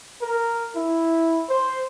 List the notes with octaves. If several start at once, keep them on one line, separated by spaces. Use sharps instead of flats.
A#4
E4
C5